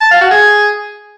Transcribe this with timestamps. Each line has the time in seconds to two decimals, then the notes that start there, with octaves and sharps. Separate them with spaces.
0.01 A5
0.11 F5
0.21 F#4
0.31 G#4